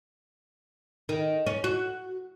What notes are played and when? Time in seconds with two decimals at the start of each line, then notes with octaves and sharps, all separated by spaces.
1.09 D#3
1.47 C#4
1.64 F#4